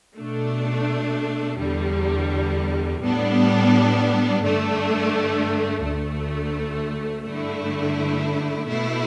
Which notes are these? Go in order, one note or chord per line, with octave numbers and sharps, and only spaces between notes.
B2 A3 D4
E2 D3 G3
A2 G3 B3 D4
G2 D3 A3 D4
D2 D3 A3
G2 D3 A3 E4
B2 A3 E4